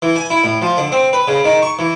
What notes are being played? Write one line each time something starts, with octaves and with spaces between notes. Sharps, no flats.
E3
G#5
E4
A2
F3
D3
C4
B4
C#3
D#3
C#6
E3